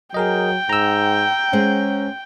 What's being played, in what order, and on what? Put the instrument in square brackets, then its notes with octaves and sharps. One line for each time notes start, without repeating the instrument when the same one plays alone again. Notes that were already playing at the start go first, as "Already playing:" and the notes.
[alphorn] F#3 [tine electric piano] G#4 A#4 D#5 [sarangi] G5
[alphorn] G#2 [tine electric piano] A#5 E6
[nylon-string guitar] G#3 C5 F#5 [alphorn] C#4